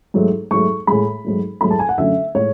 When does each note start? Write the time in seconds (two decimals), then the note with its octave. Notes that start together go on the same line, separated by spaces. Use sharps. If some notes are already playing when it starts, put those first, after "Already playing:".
0.14 G#2 F#3 A3
0.51 G#2 F#3 A3 C#6
0.87 A2 G#3 B5
1.24 G#2 F#3 A3
1.61 G#2 F#3 A3 B5
1.71 A5
1.79 G#5
1.89 F#5
1.98 F#2 D3 F#3 A3 E5
2.34 A2 G#3 C#5